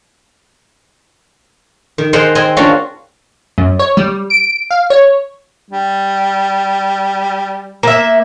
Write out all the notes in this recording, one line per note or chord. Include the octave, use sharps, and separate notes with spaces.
D#3
G#4 A#4 C5 D#5 F#5
C4 A#4 D#5 G#5
A#3 C#4 D4 F4 F#4
F#2
C#5
G3
D7
F5
C#5
G3
A#3 E5